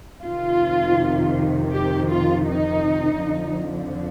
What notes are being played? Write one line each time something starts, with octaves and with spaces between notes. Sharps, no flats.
F2 C3 D#3 F4
G4
F4
D#4
F2 D3 F3